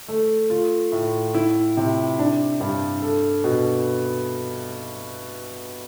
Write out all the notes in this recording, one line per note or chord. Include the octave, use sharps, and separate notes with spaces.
A3
F4
A2
E4
C3
D4
G2
A4
B2